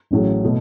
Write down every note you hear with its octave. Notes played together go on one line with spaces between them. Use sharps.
A1 A2 F#3 C#4 G#4
B2 A3